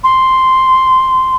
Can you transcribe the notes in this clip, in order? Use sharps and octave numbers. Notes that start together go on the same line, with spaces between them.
C6